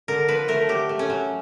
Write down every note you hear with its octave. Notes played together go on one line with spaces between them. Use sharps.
D3 A#4
F3 B4
A3 A#4
F#3 G4
A3
C#4
F#3